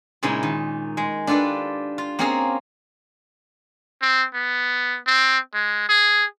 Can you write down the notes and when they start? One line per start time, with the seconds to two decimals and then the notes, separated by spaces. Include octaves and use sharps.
0.23 A#2 C#3 G#3 D#4 E4
0.43 D#3
0.97 G#3
1.27 D4 F4 G4 A4 B4
1.98 F4
2.19 A#3 C4 C#4 F4 G#4 A#4
4.02 C4
4.34 B3
5.06 C4
5.54 G#3
5.89 G#4